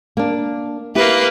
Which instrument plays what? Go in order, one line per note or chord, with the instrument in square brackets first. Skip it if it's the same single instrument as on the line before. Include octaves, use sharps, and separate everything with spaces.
[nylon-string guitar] A#3 D4
[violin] A#3 B4 [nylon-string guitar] E4 G4